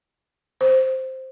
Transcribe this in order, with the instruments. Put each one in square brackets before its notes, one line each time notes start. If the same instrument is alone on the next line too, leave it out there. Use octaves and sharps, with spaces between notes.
[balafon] C5